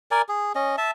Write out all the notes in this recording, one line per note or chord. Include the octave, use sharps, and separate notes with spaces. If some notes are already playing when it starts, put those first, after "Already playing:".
A#4 D5 G#5
G#4
C#4 D#5
E5 A5